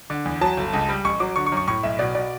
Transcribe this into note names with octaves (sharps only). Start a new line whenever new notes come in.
D3
E2
F#3 A5
G1
C#2
G3
A1 C#6
F#3 D6
D3 C#6
C#6
F#2
C#6
A2 C#6
B1 E5
B2 D5
B2 D5